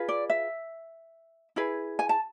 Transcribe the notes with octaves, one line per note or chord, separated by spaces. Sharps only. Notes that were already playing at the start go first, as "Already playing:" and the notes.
Already playing: F4 G#4 B4
D5
E5
E4 G#4 B4
G#5
A5